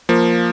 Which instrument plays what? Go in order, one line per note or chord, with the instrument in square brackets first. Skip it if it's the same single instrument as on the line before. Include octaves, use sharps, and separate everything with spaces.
[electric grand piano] F3 A#3